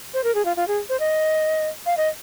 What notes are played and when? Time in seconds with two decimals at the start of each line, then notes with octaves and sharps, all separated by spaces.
0.14 C5
0.24 A#4
0.35 G#4
0.45 F4
0.57 F4
0.68 G#4
0.89 C5
1.00 D#5
1.86 F5
1.97 D#5